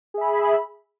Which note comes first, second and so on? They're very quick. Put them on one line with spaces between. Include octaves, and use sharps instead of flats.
G#4 E5 B5